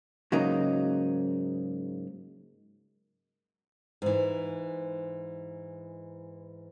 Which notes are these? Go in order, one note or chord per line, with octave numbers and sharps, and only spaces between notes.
G#2 C#3 F#3 A#3 D#4
G#2 E3